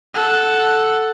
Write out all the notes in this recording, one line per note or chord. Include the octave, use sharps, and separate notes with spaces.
A4 F#5